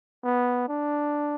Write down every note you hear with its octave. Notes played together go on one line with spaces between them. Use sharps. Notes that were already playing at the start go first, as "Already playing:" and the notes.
B3
D4